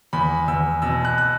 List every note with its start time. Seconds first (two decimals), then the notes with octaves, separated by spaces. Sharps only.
0.13 E2 B5
0.48 E2 E6
0.82 B2 E6
1.05 F#6
1.18 F#6